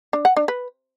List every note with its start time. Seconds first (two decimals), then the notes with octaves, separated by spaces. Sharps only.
0.13 D4
0.25 F#5
0.37 D4
0.48 B4